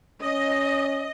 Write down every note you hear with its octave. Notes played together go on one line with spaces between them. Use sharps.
C#4 D#5